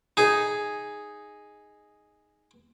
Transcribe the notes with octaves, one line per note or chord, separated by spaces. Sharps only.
D#4 G#4